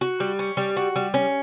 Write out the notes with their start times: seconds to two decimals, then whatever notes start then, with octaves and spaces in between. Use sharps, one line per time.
0.01 F#4
0.20 G3
0.39 C#4
0.57 G3
0.76 F#4
0.96 G3
1.14 C#4